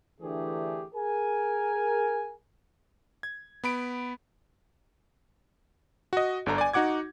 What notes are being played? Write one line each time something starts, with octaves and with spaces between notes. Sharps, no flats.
D3 E3 A3 D4 G4 G#4
G#4 A#4 G#5
G#6
B3 B5 D7
F#4 D#5
G1 D3 D4 A#5
D5 G#5
D#4 F#4 F#5 D6 G#6